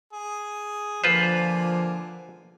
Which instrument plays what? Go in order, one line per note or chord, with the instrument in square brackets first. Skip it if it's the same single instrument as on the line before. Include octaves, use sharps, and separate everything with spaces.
[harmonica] G#4
[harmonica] D3 A#3 G#5 [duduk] F3 [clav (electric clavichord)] F4 B4 C5